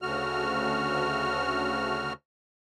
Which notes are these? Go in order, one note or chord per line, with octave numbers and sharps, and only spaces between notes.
D2 C#3 A3 F#4 F6